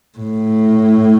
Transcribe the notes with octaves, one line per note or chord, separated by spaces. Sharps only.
A2